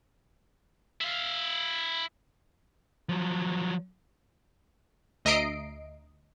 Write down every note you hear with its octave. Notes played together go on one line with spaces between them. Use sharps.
E4 F5
F3 F#3
D2 D#5 E5 A#5 C7 D7